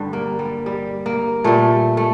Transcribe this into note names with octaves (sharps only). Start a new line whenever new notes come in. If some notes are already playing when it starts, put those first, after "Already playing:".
Already playing: G2 D3 G3
A#3
G3
G3
A#3
A#2 G3 A3
A3